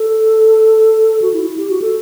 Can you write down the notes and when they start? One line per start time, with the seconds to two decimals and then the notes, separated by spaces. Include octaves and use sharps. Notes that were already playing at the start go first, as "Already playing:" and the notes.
Already playing: A4
1.22 F#4
1.34 E4
1.46 E4
1.57 G4
1.70 F#4
1.82 A4